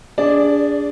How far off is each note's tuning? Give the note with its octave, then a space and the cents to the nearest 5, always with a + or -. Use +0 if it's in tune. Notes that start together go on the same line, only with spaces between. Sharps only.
D4 -25 G#4 -15 D5 +0